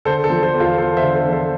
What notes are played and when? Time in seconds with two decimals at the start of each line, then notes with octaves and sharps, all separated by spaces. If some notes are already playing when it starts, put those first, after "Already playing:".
0.05 D3 A4 C5
0.24 A4 C5
0.30 F3
0.42 A4 C5
0.54 E2
0.60 F4 A4
0.78 E2 A4 C5
0.97 C5 E5
1.02 D3
1.15 A4 C5
1.27 F3
1.33 A4 C5